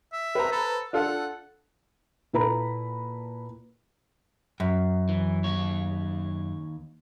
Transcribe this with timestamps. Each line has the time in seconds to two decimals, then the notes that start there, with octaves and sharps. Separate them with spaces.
0.12 E5
0.35 B4 C5 A#5
0.52 A4
0.93 D4 F4 A4 F#5
2.33 A#2 E4 A4 B4 A#5 B5
4.60 F#2
5.09 E3
5.44 D#2 C#5